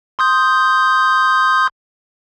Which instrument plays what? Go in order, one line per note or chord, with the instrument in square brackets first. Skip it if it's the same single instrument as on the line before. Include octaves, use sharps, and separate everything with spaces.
[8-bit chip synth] C6 D#6 G6